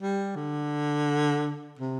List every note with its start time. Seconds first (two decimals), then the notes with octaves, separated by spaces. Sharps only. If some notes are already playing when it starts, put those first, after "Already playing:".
0.01 G3
0.36 D3
1.79 C3